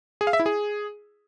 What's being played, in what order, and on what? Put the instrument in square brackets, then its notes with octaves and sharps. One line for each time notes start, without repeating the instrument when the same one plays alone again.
[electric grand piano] G#4
F5
E5
E4
G#4